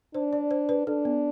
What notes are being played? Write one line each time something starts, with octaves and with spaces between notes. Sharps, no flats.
D4 C5
D5
C5
B4
D4 A4
B3